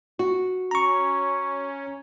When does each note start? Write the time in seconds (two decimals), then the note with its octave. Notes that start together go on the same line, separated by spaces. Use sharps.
0.19 F#4
0.71 C#4 A#5 C#6